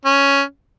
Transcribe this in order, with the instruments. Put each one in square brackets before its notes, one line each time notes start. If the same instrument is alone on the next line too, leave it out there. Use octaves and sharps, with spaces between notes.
[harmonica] C#4